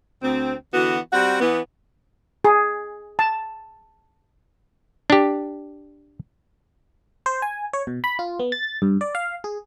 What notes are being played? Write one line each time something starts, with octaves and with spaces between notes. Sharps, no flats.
D2 C4
D3 E3 B3 F#4
G3 C4 F#4 F#5
E3 B3
G#4
A5
D4 G4
C5
G#5
C#5
B2
B5
F4
B3
A6
G2
D5
F5
G#4